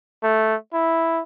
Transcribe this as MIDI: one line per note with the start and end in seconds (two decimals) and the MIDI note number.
0.23 0.55 57
0.73 1.22 64